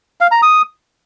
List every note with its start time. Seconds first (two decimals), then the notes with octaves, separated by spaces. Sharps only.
0.21 F5
0.31 A#5
0.42 D#6